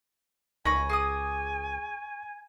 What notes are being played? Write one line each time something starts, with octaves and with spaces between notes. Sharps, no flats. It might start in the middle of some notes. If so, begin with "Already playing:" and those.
C#2 G#5 B5 C#6 A#6
G#4 D6 D#6